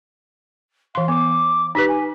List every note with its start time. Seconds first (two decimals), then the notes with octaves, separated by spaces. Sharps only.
0.95 E3 F5 C6
1.08 B3 D6
1.75 D#4 G4 B4 B6
1.88 G#5